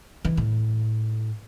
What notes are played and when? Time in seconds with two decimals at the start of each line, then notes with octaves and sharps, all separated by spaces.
0.25 E3
0.37 A2